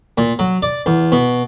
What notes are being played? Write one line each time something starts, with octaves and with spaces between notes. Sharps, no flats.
A#2
F#3
D5
E2
B2